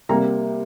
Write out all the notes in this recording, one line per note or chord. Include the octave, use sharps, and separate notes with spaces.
C3 G3 A#3 A#5